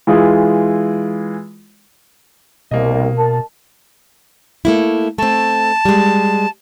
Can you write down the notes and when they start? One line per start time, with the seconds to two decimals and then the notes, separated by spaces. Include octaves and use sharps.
0.07 E3 G#3 F4 G#4
2.71 C2 B2 A#3 D#5
3.17 A#4 A5
4.65 A3 A#3 E4
5.18 A3 C4 A5
5.85 G3 G#3